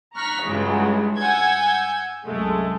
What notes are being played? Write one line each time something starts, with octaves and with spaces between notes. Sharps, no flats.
A#5 C#6 F6 F#6 A#6 B6
C#2 G2 E3 F#3 G#3
F#5 G#5 E6 G6 G#6
C2 F#2 G#3 A3